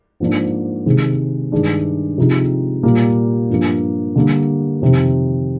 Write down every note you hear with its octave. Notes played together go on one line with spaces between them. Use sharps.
G#2 F3 A#3 D4
C3 D#3 G#3
G2 D#3 G#3 D4
C3 F3 G#3 C4 D#4
A#2 G3 A#3
G2 F3 A#3
D3 G3 A#3
F2 C3 D#3